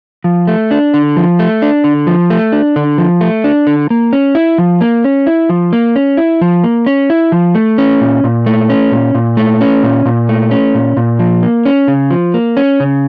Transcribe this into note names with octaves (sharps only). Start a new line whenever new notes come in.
F3
A3
D4
D3
F3
A3
D4
D3
F3
A3
D4
D3
F3
A3
D4
D3
A#3
C#4
E4
F3
A#3
C#4
E4
F3
A#3
C#4
E4
F3
A#3
C#4
E4
F3
A3
C#4
A#2
A#2
A3
C#4
A#2
A#2
A3
C#4
A#2
A#2
A3
C#4
A#2
A#2
F3
A#3
C#4
C#3
F3
A#3
C#4
C#3